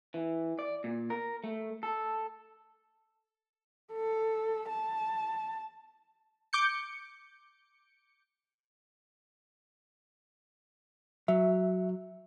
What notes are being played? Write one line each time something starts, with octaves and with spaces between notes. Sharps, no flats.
E3
D5
A#2
A#4
A3
A4
A4
A5
D6 G6 C#7
F#3 E5